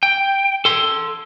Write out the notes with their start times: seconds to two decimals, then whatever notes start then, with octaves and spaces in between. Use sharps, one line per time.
0.03 G5
0.65 A4 C6